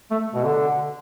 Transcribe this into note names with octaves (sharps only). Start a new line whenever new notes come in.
A3
B2
D3